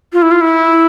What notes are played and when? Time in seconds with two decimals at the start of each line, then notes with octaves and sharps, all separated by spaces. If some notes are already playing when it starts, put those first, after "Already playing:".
0.13 F4
0.22 E4
0.31 F4
0.41 E4